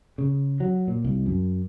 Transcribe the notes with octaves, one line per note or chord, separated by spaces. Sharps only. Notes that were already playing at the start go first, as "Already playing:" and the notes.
C#3
F#3
A#2
C2
F#2